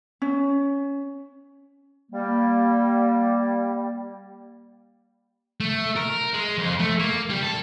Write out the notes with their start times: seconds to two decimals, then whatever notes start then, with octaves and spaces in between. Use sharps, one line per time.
0.22 C#4
2.11 G3 A#3
5.60 A3
5.96 A#4
6.34 G#3
6.58 F2
6.79 A3
6.99 A#3
7.30 G3
7.43 A4